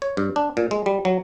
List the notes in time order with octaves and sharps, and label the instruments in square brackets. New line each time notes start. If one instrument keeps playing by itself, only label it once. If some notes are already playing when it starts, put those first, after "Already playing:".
[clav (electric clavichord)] C#5
G2
D4
A#2
G#3
G3
F#3